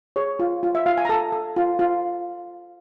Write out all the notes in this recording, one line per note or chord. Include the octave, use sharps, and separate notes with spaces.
G#4 C#5
F4
F4
E5
F4 F5
G#5
A#5
A4 A5
A4
F4
F4